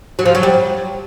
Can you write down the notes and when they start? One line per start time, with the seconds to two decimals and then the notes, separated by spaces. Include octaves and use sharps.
0.19 F#3
0.26 F3
0.35 F#3
0.43 G3